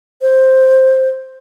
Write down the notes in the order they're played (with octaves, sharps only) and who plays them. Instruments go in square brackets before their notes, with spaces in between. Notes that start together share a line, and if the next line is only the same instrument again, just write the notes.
[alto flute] C5